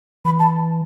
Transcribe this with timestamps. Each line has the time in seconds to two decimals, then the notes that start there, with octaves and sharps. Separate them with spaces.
0.25 E3 B5
0.39 A5